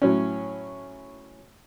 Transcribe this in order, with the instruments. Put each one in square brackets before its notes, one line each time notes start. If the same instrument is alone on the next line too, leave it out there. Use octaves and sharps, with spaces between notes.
[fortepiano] A2 F#3 C#4